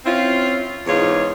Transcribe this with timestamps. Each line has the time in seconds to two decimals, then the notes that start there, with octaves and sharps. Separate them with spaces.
0.05 C4 C#4 E4 F4
0.87 E2 G#2 D#4 F4 C#5